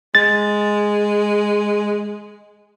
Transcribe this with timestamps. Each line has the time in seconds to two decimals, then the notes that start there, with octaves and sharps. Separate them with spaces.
0.15 G#3 A6